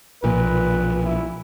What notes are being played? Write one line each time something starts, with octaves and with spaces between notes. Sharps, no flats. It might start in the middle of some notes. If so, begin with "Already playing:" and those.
B1 A#2 F3 B4
E4